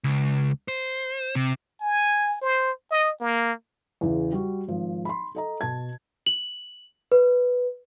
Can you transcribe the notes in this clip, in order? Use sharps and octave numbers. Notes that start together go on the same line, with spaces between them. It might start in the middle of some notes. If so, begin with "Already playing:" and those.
C#2
C5
C3
G#5
C5
D#5
A#3
E2 C#3 E3
G3 F#4
G#1 F3
B5 C6
A4 D#5 A#5
B2 A5 G#6
F#7
B4